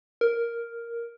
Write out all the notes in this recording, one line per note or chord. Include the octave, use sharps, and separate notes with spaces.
A#4